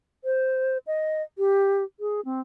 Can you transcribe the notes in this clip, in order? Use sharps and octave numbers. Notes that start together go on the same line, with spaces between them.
C5
D#5
G4
G#4
C4